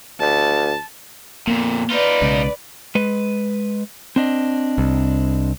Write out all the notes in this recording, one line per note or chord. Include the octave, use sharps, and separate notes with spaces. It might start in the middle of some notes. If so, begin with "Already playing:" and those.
D2 A5
F2 A#2 A#3 B3
D#4 F4 B4 D5
B1 C#3 G#3
G#3 B4
C4 D4 D#5
C2